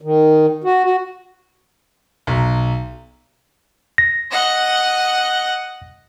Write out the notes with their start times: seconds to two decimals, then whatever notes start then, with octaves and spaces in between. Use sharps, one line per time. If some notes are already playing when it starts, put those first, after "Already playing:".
0.01 D#3
0.64 F#4
0.84 F#4
2.27 B1
3.98 A#6
4.31 D#5 F#5